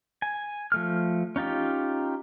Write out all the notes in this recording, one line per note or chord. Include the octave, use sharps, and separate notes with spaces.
G#5
F3 A3 F6
C#4 D#4 F4 G4